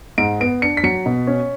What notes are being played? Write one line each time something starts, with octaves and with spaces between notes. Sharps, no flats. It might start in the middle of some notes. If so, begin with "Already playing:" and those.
G#2 D7
B3 D7
D4 C#7
B6
F#3 C#7
B2
C#4